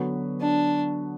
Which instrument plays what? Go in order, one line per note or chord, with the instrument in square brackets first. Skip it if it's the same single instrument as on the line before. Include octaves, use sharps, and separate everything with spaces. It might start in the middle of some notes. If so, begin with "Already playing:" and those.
Already playing: [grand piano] D3 F#3 B3 F#4 B4
[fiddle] D4